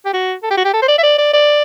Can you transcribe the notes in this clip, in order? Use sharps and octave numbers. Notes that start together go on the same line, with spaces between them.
G4
F#4
A4
G4
F#4
G4
A4
C5
D5
E5
D5
D5
D5